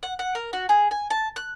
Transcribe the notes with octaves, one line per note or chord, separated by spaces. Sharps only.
F#5
F#5
A#4
F#4
G#4
G#5
A5
F#6